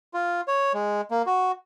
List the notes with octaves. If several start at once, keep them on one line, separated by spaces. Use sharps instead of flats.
F4
C#5
G#3
A#3
F#4